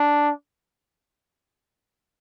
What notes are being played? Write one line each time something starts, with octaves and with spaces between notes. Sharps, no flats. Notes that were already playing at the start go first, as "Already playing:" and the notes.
Already playing: D4